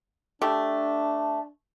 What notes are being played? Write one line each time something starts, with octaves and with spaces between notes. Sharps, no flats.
A3 D4 G4 A4